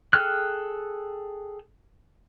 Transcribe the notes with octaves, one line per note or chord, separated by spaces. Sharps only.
G#4 A4 G5 F6 F#6